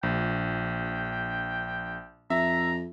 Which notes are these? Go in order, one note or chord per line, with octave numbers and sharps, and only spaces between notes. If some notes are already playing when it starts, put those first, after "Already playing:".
A#1 G5
F2 E5 A#5